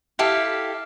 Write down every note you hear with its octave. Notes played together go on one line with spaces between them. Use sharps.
E4 G4 A4 F5